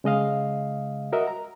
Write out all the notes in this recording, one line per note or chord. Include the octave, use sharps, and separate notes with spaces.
C#3 G#3 D#5 F5
F#4 A#4 D#5 E5 F#5
A#5